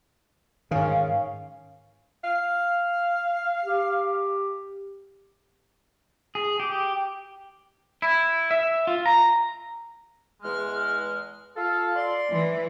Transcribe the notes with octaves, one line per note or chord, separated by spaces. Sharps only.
G#2 D#3 C#4 F5
F5
G4
G#4
G4
E4
E5
F4
A#5
E2 G#3 F6
F4 A4 F5
D5 C6
E3